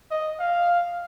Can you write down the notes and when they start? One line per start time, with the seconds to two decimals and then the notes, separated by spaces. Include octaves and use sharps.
0.11 D#5
0.40 F5